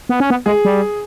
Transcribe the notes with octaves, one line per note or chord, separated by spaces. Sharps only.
B3
C#4
B3
G#3 G#4
G3